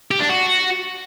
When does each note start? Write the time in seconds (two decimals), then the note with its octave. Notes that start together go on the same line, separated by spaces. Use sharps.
0.11 G4
0.20 D4
0.30 F#4